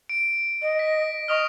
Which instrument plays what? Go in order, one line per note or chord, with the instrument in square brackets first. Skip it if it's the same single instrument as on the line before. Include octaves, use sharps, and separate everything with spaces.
[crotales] D7
[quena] D#5
[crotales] B6
[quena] D#5 [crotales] C#6 D#6 F6